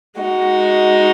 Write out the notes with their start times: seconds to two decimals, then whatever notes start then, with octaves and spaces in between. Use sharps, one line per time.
0.21 G#3 D#4 F#4